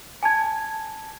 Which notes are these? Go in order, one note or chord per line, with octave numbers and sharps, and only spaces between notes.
G#5 A5 G#6